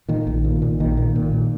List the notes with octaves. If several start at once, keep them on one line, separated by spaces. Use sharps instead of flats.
A#2 D#3
A#1
A#2
A#2
A#1 D#3
A#2
A#2
A#2